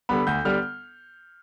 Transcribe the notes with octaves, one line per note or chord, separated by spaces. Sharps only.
D3 G3 B3 B5
D2 G6
D3 G3 B3 F6